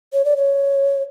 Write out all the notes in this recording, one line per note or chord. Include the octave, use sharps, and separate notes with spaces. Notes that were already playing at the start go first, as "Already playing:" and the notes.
C#5
D5
C#5